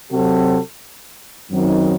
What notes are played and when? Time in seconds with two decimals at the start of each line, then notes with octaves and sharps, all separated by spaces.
0.11 C3 F#3 C4 F#4 A4
1.49 F#2 D#3 F#3 C4 D#4